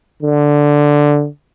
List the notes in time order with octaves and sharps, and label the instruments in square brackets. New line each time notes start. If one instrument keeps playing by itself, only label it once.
[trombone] D3